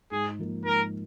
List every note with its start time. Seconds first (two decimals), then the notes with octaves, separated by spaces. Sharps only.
0.11 G#2 G#4
0.39 F3 A#3
0.65 G#2 A#4